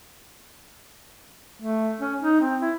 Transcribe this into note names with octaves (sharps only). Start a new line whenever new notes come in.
A3
C#4
D#4
C4
E4